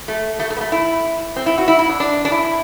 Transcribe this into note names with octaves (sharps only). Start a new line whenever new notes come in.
A3
A3
A3
B3
A3
E4
C4
E4
F#4
E4
E4
D4
D4
D4
E4